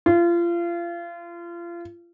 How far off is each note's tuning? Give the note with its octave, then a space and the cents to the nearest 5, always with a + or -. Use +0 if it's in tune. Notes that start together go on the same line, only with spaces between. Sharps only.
F4 -30